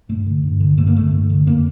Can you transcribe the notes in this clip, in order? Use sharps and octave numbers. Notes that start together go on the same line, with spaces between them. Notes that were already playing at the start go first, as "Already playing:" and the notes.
G2 A3
D3
G2
D3
G2 A3
A#3
D3 A3
G2
D3
F2 A#3